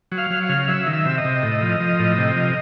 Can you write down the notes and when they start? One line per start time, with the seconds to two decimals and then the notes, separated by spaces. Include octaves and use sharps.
0.12 F#3
0.18 F5
0.30 F#3
0.43 F5
0.49 C#3
0.68 F#3 E5
0.86 D#3
0.93 E5
1.05 C3
1.18 D#5
1.24 C3
1.43 A2
1.61 F3
1.80 F3
1.99 A2
2.18 C3
2.36 F3